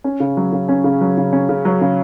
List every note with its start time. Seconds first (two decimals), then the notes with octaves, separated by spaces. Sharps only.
0.04 C#4
0.20 C#3
0.37 F#3
0.52 C#3
0.69 C#4
0.84 C#3
1.01 F#3
1.18 C#3
1.33 C#4
1.49 C#3
1.65 F#3
1.81 C#3